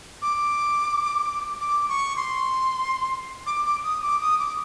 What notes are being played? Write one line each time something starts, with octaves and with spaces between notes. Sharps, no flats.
D6
D6
C#6
C6
D6
D6
D#6
D6
D#6
D6